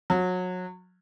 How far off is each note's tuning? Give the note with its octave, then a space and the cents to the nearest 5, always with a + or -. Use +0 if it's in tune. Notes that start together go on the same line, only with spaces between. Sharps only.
F#3 -25